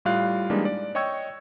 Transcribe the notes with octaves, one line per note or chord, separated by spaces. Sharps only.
A2 G3 F4 F5 F#6
E3 G3 G#3 A#3 D4 D#4
D5
C#5 D#5 G5 C#6 E6 G#6